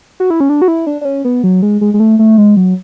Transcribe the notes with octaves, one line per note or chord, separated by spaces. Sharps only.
F#4
E4
C#4
D4
F#4
E4
D4
D4
C#4
B3
F#3
G#3
G#3
G#3
A3
A3
G#3
F#3